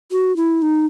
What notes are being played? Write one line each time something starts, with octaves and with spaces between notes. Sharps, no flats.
F#4
E4
D#4